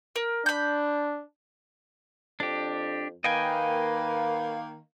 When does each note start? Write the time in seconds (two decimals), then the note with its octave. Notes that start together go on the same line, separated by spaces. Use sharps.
0.16 A#4
0.46 D4 B5 G6
2.40 F2 D4 G4
3.24 D#3 A#3 B4 D#5 F5 G5 G#5